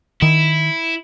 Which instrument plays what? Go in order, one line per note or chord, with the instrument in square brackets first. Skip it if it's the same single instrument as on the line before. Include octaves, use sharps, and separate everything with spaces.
[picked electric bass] D#3 [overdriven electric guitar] E4